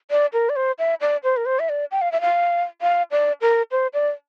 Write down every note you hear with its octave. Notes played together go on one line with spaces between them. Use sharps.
D5
A#4
D5
C5
E5
D5
C5
A#4
C5
E5
D5
G5
F5
E5
F5
F5
D5
A#4
C5
D5